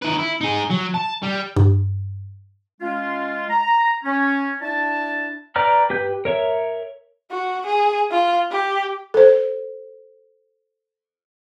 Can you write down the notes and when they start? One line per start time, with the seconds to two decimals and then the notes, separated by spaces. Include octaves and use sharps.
0.02 D#3 B4
0.19 E4
0.41 D#4 G#4
0.70 F#3
0.94 A5
1.23 G3
1.57 G2
2.81 G#3 C#4 F4
3.49 A#5
4.04 C#4
4.62 D4 E4 D5 E5 A5
5.56 B4 D5 G5 A#5 F6
5.90 G4 B4 G5 G6
6.25 A#4 C#5 E5
7.31 F#4
7.66 G#4
8.11 F4
8.51 G4
9.14 A4 C5